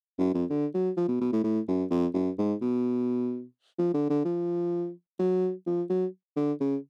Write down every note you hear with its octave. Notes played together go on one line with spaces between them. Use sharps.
F#2
F2
D3
F#3
F3
B2
B2
A2
A2
F#2
F2
F#2
G#2
B2
F3
D3
D3
F3
F#3
F3
F#3
D3
C#3